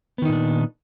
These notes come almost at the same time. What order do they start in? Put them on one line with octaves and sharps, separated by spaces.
B3 D#3 D#4 A#2 D4